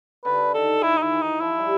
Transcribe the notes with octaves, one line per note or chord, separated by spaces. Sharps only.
D3 B4
D#3 A4
D#3 E4
D#4
D#3 E4
E3
D#4
F3 E4
G3